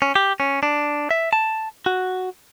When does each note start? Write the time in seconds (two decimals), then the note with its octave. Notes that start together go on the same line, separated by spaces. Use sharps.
0.02 C#4
0.16 G4
0.40 C#4
0.63 D4
1.11 E5
1.33 A5
1.86 F#4